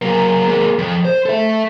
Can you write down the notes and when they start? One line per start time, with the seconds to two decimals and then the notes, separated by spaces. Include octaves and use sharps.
0.02 F#3 A#3
0.48 G#3 A#3
0.79 F2
1.05 C5
1.25 A4 E5